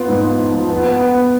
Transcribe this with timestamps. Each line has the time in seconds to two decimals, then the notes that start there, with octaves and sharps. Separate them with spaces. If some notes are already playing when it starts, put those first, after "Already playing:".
Already playing: B3 F4
0.08 G#2
0.24 F4
0.39 F3
0.55 F3
0.70 B3
0.86 B3
1.01 B3